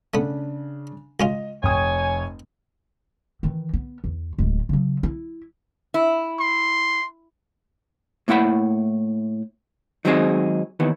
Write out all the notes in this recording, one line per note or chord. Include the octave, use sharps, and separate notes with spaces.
C#3 A3 B3 D4
C#2 C#4 F4 D#5
F1 C#5 G5 G#5 D#6
D#3 E3
B3
E2
D1 G#3
C#3 F#3
E4
E4
C6
A2 A#3 E4 F#5 B5
D#3 F#3 G#3 C4 D#4 G#4
D#2 D#3 E3 B3